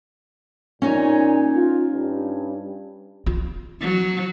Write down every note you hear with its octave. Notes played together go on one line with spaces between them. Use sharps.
A#2 C#4 D#4 C#5
F4
G2
F4
F#3